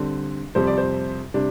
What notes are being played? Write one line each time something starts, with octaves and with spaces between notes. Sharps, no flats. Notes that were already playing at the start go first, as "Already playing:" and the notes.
Already playing: D3 G3 C4
F2 C3 G3 C4 C5
D5
C5
C3 G3 D4